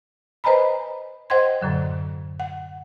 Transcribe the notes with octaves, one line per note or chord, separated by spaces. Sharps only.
B4 C5 D#5 G#5 A#5 B5
C5 D#5 F#5 G5 C6 G#6
F#2 A2 D3 F#3
F#5